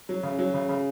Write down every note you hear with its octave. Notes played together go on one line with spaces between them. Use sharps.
F#3
C#3
F#3
C#3
C#3